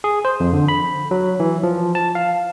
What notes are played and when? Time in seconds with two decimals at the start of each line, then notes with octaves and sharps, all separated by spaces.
0.04 G#4
0.25 C5
0.40 F2
0.53 D3
0.68 B5
1.11 F#3
1.40 E3
1.63 F3
1.95 A5
2.15 F5